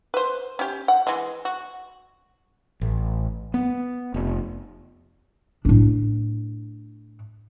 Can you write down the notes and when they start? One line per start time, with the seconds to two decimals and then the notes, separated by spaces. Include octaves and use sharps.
0.14 B4 C5
0.59 C#4 G4
0.88 F#5
1.07 E3 G#3
1.45 F#4
2.81 A1
3.54 B3
4.14 F1
5.65 A2 D4